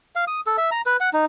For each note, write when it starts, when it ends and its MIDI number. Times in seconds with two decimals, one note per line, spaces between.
0.16 0.25 77
0.27 0.41 87
0.47 0.57 69
0.58 0.70 76
0.71 0.81 82
0.86 0.97 71
1.00 1.10 78
1.13 1.25 63